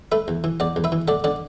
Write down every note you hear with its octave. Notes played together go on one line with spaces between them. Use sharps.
A3 B4 E5
E2
E3
E2 D5 F#5
E2
B4 E5
E3
A3 D5 F#5
D3 D5 F#5